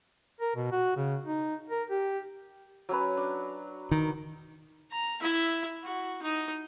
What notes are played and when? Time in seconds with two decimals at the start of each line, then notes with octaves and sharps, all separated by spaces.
0.40 A#4
0.56 B2
0.72 F#4
0.97 C#3
1.27 D#4
1.70 A#4
1.90 G4
2.89 F#3 C#4 B4
3.17 D4
3.91 D#3
4.92 A#5
5.22 E4 E5
5.83 F#4
6.22 D#4 D#5